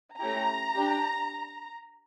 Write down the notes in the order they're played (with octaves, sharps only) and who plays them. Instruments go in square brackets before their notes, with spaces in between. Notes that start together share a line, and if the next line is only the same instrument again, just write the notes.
[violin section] A3 C#4 E4 G4 A#5
D4 G4